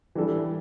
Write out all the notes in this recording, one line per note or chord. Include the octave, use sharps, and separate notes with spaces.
E3 G3 D4 A4